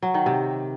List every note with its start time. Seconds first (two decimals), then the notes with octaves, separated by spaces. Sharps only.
0.02 F#3
0.14 D#3
0.26 C3